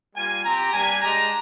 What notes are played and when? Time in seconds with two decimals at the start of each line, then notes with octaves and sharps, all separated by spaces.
0.15 G3 A#3 F4 G#5
0.43 C4 G4 A#5
0.72 G3 A#3 D4 G4 G#5
1.01 G#3 D4 G4 A#5